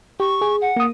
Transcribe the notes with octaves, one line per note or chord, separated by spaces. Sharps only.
G4 C#6
G#4
F#5
A#3 D#6